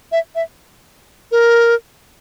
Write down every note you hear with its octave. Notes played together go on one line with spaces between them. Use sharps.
E5
E5
A#4